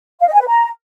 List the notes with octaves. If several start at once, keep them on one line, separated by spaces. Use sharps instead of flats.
F5
D#5
G#5
B4
A#5